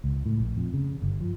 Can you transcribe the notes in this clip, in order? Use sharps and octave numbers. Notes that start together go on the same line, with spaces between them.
C#2
A2
A#1
F2
C#3
G1
F3